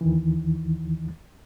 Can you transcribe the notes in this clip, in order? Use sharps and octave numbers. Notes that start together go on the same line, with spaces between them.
D#2 D#3 E3